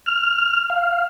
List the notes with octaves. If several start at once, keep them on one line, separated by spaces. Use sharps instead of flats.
F6
F5